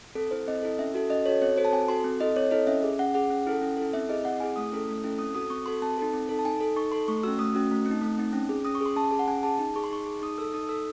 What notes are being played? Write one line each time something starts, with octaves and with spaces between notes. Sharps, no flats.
C4 A4
E4 A4 C5
C4 D#5
E4 A4
C#4 E5
F#4 A4
C#4 D#5
F#4 A4 C#5
C4 C#5
F#4 A4 C5
A5
C4 G#5
F#4 A4 C6
C4
E4 A4 D#5
C4 C#5
E4 A4 D#5
C#4 E5
G#4
C#4 F#5
G#4 F#5
C#4
E4 A4
C#4
E4 A4
C4 E5
E4 G#4 D#5
C4 F#5
E4 G#4 G#5
A3 D#6
C#4 E4 A4
A3
C#4 E4 A4
C4 D#6
F#4 A4 D#6
C4 C#6
F#4 A4 C6
C4 A5
D#4 A4
C4
D#4 A4
A5
D#4 G#5
A4
D#4 C#6
A4 C6
A3 C#6
C#4 F#4 E6
A3 D#6
C#4 F#4
A3
C4
D#4
A3
C4 D#4
C#4
G#4
C#4 D#6
C#6
G#4 C6
C#4 A5
G#4
F#5
C#4 G#5
G#4 A5
D#4
G#4 C#6
C6
D#4 C#6
G#4
D#4 D#6
A4 E6
D#4 D#6
A4 E6